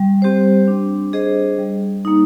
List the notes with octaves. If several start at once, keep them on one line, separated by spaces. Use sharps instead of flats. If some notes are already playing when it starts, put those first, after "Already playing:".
Already playing: G3
C4 G4 C5
D4
G#4 C5 D#5
G3
A#3 D#4